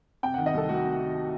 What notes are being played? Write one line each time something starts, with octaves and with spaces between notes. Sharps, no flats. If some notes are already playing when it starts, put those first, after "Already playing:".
C3 G5
F#5
D#3
D#5
C2 A4
A3 F#4
C3
D#3